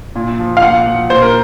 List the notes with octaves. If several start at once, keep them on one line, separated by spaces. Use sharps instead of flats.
A#2
F3
F5
A#2 F#5
F3
A#2 C5
A#4